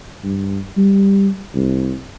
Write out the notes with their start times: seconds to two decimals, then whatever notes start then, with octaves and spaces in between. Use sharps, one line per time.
0.24 G2
0.77 G3
1.55 C2